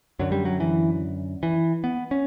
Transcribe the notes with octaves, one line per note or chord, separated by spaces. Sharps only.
F#2 D3 F#3
G3
F#3
E3
E3
B3
C#4